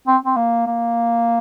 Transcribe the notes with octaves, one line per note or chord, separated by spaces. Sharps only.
C4
C4
A#3
A#3